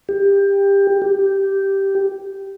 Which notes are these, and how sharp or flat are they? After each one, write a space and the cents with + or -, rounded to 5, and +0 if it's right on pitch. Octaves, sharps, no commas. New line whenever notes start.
G4 +20
G4 -5